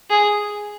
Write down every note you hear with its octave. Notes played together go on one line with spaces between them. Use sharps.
G#4